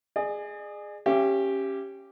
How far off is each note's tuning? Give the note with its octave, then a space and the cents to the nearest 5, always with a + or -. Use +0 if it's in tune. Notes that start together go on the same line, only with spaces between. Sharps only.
G#4 +0 D5 +45
C#4 -15 G4 +0 E5 +40